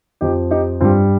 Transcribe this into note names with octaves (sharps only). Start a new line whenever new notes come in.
F2 F3 D#4 G4
D#4 G4
G2 G3 C4 F4